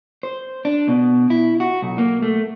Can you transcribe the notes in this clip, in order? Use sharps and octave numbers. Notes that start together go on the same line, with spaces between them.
C5
D4
B2
E4
F#4
B1
A#3
A3